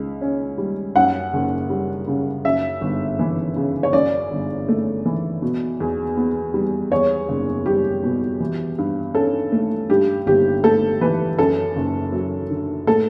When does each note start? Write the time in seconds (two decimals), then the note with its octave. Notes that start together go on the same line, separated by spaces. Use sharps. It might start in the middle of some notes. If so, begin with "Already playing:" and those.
Already playing: C#2
0.21 C#4
0.58 G3
0.96 F#2 F#5
1.33 F#1
1.70 G3
2.07 C#3
2.45 F#2 E5
2.81 G1
3.19 E3
3.56 C#3
3.83 C#5
3.93 F#2 D5
4.31 G1
4.68 A3
5.06 E3
5.42 B2
5.80 E2
6.17 B3
6.54 G3
6.92 E2 C#5
7.28 F#1
7.66 G3 G4
8.03 B2
8.40 E3
8.78 G2
9.15 C#4 A4
9.52 A3
9.90 G2 G4
10.26 G1 G4
10.63 A3 A4
11.01 E3 B4
11.38 F#2 A4
11.76 F#1
12.12 F#3
12.50 D3
12.87 A2 A4